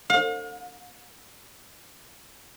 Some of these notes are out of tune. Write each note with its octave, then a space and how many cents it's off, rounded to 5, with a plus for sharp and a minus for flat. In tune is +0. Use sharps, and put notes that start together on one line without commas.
F5 +40